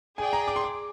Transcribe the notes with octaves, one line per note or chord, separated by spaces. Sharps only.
G#4 D5 G5 G#5
A#5
D6
C6
D6